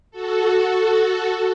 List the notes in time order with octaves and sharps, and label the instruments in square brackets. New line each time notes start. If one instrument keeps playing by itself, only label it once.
[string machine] F#4 A4